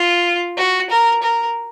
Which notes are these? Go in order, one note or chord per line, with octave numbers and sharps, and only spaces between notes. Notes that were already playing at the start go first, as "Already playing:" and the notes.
Already playing: F4
F#4
A#4
A#4